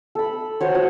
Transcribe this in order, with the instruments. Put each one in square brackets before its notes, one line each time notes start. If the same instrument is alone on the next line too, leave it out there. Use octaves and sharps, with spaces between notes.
[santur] A4 B5
F#4 C5 C#5
F#4